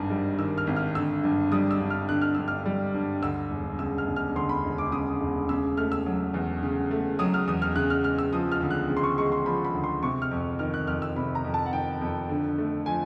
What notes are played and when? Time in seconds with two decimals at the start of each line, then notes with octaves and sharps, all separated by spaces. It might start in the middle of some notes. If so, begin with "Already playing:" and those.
Already playing: G#1 G2 D#3
0.10 G3
0.39 D#3 E6
0.58 F6
0.67 G#1
0.76 F6
0.95 D3 E6
1.24 G2
1.52 G3 D#6
1.71 E6
1.80 G2
1.90 F6
2.09 D3 F#6
2.22 F6
2.35 G2 E6
2.48 F6
2.66 G3
2.94 G2
3.22 D2 E6
3.51 E1
3.79 C#3 E6
3.98 F6
4.07 E1
4.16 F6
4.36 D2 C6
4.49 B5
4.64 E1
4.78 D6
4.92 C#3 D#6
5.20 E1
5.49 C#3 E6
5.77 A3 F6
5.92 E6
6.06 F#3
6.34 E2
6.62 C#3
6.91 A3
7.19 F#3 D#6
7.34 F6
7.48 E2 D#6
7.62 F6
7.76 C#3 F#6
7.90 F6
8.04 G#3 F6
8.18 E6
8.33 F3 D#6
8.52 F6
8.61 D2
8.71 F#6
8.89 C#3
8.97 C6
9.03 C#6
9.18 G#3 C#6
9.32 C6
9.46 F3 B5
9.65 B5
9.74 D2
9.84 C6
10.03 C3 C#6
10.22 F6
10.31 F2
10.59 D#3 F6
10.74 F#6
10.87 F2 F6
11.02 E6
11.16 C3 B5
11.35 A#5
11.44 F2
11.54 A5
11.66 F#5
11.73 D#3 G5
12.01 F2
12.29 D3
12.58 A3
12.86 F3 G#5